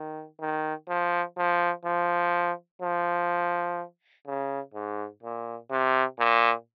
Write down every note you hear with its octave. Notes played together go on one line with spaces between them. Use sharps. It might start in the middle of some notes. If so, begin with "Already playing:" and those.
Already playing: D#3
D#3
F3
F3
F3
F3
C#3
G#2
A#2
C3
A#2